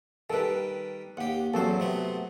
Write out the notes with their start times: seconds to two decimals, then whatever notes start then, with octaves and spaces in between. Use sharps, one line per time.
0.30 D#3 G3 A4 B4
1.17 D#2 G4 F#5
1.54 A1 E2 F#3 C4 A4 C5
1.80 C3 A3 B3